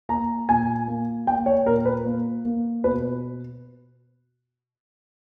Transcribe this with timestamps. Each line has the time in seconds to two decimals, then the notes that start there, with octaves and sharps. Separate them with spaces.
0.09 A#3 A#5
0.49 A#2 G#5
0.88 A#3
1.27 A#3 G5
1.46 C#5
1.66 A#2 A#4
1.85 B4
2.05 A#3
2.45 A#3
2.84 B2 B4